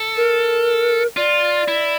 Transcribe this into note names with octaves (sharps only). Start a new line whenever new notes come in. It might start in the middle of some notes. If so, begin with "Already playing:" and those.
Already playing: A4
A#4
F4 D5
E4